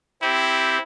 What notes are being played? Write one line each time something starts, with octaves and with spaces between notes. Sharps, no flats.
C4 E4 G4